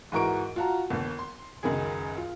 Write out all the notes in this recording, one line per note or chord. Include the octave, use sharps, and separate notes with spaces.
G#2 E3 F#4 A#4 C#6 D7
F4 F#4 A5 A#5
G1 D#2
C6
C#2 F#2 D#3 G#4
F4